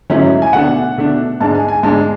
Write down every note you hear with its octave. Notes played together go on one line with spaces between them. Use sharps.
G#2 F#3 A3 C#4 E4
G#5
B2 A3 D4 F#5
B2 A3 D4
G#2 G#3 D4 A5
G#5
G#5
G#2 G#3 D4 A5